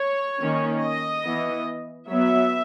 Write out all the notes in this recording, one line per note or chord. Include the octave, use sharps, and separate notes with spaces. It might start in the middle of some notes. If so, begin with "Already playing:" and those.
Already playing: C#5
D#3 A#3 C#4
D#5
E3 B3
F#3 B3 E5